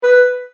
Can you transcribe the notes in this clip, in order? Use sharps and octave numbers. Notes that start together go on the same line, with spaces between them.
B4